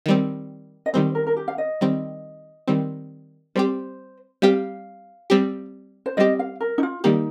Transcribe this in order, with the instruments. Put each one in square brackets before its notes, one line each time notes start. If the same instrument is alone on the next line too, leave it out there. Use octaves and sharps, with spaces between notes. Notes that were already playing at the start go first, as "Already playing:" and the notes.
[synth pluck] D#3 G3 C4
[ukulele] D#5
[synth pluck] D#3 G3 C4 [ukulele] C5
[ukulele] A#4
A#4
G4
F5
D#5
[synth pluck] D#3 G3 C4
D#3 G3 C4
[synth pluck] G3 C4 G4 [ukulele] C5
[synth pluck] G3 C4 G4 [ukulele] F5
[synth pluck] G3 C4 G4
[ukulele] C5
[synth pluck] G3 C4 G4 [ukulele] D#5
[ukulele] F5
A#4
D#4
F4
[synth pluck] D#3 G3 A#3 G4 [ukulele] D#4